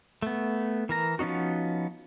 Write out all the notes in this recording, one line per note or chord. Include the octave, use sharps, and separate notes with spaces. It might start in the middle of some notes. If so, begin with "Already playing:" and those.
A3 B3
E3 A#4 A#5
F3 B3 C#4 D#4 F#4